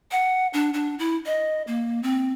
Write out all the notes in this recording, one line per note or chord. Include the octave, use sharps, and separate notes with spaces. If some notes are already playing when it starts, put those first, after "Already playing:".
F#5
D4
D4
E4
D#5
A#3
C4